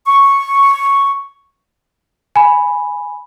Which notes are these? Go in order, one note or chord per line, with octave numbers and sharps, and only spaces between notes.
C#6
G#5 B5